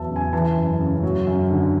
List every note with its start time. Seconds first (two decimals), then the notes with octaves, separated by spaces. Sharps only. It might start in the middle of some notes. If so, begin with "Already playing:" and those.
Already playing: E2 F#3 E5 A5
0.10 C#3
0.16 G#5
0.33 E3 A5
0.57 F#2
0.80 C#3
1.03 F#3
1.27 F#2
1.50 D3